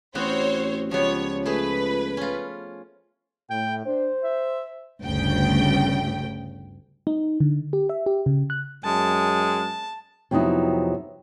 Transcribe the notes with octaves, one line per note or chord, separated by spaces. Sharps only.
A1 B3 C4 F#4 C5 C#5
C#2 F3 G3 B3 C#5
A3 G#4 B4
C#4 F4
A2 G5
D4 C5
E5
G1 D2 C#3 G5
D#4
D3
G4
E5
G4
C#3
F#6
F#2 G#3 A5
F2 C3 F#3 B3 D#4 E4